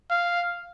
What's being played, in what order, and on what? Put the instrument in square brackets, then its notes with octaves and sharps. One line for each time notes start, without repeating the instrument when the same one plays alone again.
[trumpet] F5